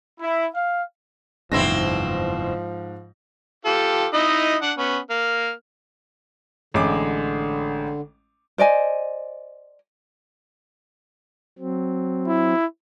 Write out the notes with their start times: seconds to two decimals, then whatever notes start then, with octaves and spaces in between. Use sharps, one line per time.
0.21 E4
0.54 F5
1.52 F#1 E2 G#2 B2 F3 C4 E4 A#6
3.65 F4 G4 A4
4.13 D#4 E4 D#5
4.62 D4 F#5
4.77 B3 C#4
5.10 A#3 F6
6.74 A1 D3 G#3 D6
8.58 C5 D5 D#5 G#5
11.59 F#3 C4
12.27 E4